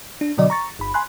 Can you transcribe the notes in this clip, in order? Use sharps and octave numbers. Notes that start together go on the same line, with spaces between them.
D4
B2 D3 F#3 D5 D#5
A#5 C#6 A6
G1 B5
G#5 B5 C6 F#6